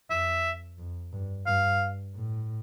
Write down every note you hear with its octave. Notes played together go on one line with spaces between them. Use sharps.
F2 E5
F2
G2
G2 F5
A2